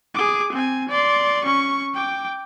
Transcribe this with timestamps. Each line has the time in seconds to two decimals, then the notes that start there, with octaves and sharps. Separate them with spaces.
0.15 G#4 D6
0.52 C4 G#5
0.89 D5 C6
1.44 C#4 C#6
1.94 G5 D6